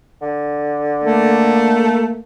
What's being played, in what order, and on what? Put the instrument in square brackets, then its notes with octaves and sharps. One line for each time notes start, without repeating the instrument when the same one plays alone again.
[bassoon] D3
[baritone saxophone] A3 [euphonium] A#3